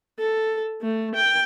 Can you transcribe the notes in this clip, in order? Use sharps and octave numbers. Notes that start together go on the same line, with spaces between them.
A4
A3
G5